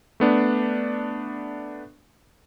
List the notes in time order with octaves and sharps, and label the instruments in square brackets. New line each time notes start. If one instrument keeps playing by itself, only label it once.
[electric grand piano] A3 B3 D4